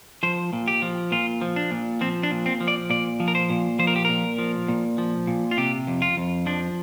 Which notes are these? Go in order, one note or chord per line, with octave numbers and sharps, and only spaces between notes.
F3 C5
A#2
G4
F3
A#2 F4
F3
D4
A#2
F3 C4
D4
A#2
C4
F3
D5
A#2 D5
F3
A#4
C5
A#2
F3 C5
A#4
G4
A#2 A#4
F3
A#2
F3
A#2
F4
C3 G4
F2
F4
F2
F3 D4